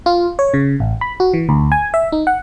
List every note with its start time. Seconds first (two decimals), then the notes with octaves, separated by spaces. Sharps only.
0.06 F4
0.39 C#5
0.54 C#3
0.80 A1
1.01 B5
1.20 F#4
1.33 E3
1.49 D2
1.72 G#5
1.94 E5
2.12 D#4
2.27 F#5